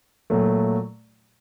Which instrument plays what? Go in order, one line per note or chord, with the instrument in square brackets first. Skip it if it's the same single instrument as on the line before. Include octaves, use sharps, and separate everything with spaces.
[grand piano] A#2 F#3 A3